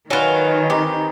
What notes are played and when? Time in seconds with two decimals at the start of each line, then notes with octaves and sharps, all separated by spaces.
0.10 D#3 F#3 F4 B4 C#5 G#5
0.70 C4 D#4 G4